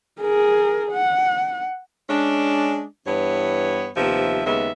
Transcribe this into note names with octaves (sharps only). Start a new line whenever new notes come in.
G#4 A#4
F#5
G#3 C#4 D4
G2 E3 B3 C#5
D#2 C3 F3 B3 E5
D#2 C#3 G#3 B3 E5